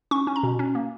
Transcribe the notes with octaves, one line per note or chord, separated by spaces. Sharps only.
C#4 C#6
C#4
A#5
B2
C#4
A#3